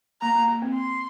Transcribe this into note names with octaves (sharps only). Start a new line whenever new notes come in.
A#3 A#5
A#3
A#3
C4
C6